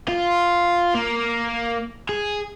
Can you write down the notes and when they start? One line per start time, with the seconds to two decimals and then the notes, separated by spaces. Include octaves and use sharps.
0.09 F4
0.95 A#3
2.09 G#4